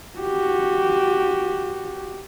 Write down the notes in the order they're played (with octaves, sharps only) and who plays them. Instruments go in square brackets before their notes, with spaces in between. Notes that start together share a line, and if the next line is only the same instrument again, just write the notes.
[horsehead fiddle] F#4 G4